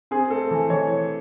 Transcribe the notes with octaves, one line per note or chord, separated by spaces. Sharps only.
C4 G#4
A3 A4
E3
E3 C#5